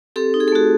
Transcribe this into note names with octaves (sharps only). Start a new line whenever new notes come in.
C4 G4 A4
D#4
G#4
A4
A3 F#4 G#4